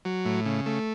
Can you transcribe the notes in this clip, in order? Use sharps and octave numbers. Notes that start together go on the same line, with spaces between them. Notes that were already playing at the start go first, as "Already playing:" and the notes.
F#3
A2
C#3
A3